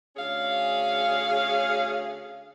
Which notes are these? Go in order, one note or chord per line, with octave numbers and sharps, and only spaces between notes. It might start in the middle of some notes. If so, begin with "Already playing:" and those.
D2 C#4 G#4 F5